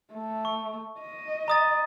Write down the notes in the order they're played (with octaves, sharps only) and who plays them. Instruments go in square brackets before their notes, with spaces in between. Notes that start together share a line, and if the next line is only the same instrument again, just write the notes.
[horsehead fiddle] A3
[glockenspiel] C#6
[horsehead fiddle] D#5
[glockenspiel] A#5 D#6 A6